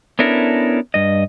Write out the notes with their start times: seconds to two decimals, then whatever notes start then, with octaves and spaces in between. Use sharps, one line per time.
0.19 B3 C#4 D4 E4 A4 A#4
0.94 G2 D#5